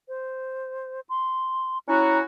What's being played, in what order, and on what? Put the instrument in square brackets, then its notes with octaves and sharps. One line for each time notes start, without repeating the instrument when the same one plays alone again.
[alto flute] C5
C6
[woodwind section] C#4 E4 F#4 [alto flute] A#5